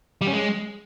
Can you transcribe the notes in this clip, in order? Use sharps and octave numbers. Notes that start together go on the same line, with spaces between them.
G3
C#4
G#3